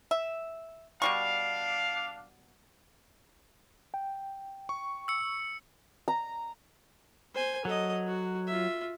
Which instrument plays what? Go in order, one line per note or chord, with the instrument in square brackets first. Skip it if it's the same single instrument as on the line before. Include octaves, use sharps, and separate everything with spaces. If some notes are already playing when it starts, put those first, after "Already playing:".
[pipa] E5
[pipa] B2 G3 C#6 [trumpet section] D4 F5
[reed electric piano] G5
[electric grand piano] C#6
[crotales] E6 C#7
[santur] A#5
[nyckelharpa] C5 G#5
[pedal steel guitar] F#3 [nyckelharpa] A4 D#5
[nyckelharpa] F#4
F4 E5